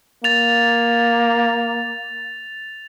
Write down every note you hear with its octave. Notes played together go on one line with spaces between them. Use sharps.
A#3 A6 F7